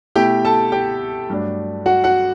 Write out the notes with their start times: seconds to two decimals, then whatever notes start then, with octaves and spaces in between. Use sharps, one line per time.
0.16 B2 A3 E4 G4 G5
0.45 A4 A5
0.72 G4 G5
1.30 G2 F#3 A3 D4
1.86 F#4 F#5
2.04 F#4 F#5